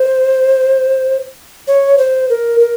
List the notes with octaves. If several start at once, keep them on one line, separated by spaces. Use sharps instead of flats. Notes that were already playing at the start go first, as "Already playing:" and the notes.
Already playing: C5
C#5
C5
A#4
A#4